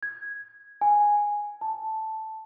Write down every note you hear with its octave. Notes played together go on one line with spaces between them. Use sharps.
G#6
G#5
A5